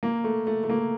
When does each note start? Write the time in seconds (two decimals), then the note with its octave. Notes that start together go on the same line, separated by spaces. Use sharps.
0.03 A#3
0.24 A3
0.47 A3
0.64 A3
0.69 A#3